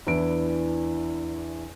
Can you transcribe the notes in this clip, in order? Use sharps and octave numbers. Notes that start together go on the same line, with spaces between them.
E2 D4 E4 B4 D7